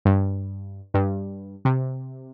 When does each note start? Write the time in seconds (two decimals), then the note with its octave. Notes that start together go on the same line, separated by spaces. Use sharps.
0.05 G2
0.94 G2
1.65 C3